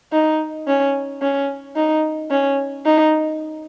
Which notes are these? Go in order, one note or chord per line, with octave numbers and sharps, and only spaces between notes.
D#4
C#4
C#4
D#4
C#4
D#4